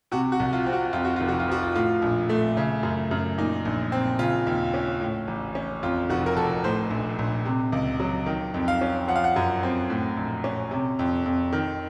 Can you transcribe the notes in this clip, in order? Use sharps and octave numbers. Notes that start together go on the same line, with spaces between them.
C3 F#4
F#4
C2
F4
C4
F#4
F2 F4
F#4
F1 F4
F#4
F4
F3 F#4
F4
A2 F4
A#1
A3
C#3
F#2
F#2
A#2 D#4
A#1
C4
C#3 F4
D#2
C#4
A2
A1
C#4
F2 F4
F1 F#4
A#4
F1 A4
A2 C5
A#1
A#1
C3
C#2
F#3
D#3
F2
F5
C#4
F3 F#5
F5
F#5
F#2
C4
A2
A#1
C#4
C3
F2
F2
D#3